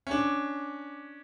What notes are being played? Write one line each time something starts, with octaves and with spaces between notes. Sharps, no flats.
C#4 D4